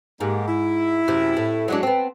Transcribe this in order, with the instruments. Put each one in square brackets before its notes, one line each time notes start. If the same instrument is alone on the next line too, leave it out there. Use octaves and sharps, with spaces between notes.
[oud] G#2 [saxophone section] G#3 A#3 G4
[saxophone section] E4
[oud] F#2 C3
A2
F#3 G#3 D4
B3 C4